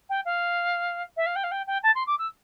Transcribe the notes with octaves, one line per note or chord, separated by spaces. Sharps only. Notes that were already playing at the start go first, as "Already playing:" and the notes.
G5
F5
E5
F5
G5
F5
G5
G5
A5
C6
D6
E6